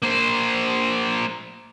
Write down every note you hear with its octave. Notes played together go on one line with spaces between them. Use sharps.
A#3 C5